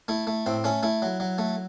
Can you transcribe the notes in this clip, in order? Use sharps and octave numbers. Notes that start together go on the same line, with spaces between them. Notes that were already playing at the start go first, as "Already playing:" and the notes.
A3 E4
A3
A2 C4
A3 C#4
A3 E4
F#3
F#3
A3